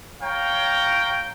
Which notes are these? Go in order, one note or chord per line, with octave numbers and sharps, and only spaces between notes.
C#5 F5 G5 A#5